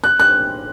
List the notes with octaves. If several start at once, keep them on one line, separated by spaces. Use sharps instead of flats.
F#6
F#6